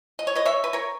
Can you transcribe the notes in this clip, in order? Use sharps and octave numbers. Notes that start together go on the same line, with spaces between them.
D#5
C#5
B4 D#5
C#5 E5
B4
A#4 C#5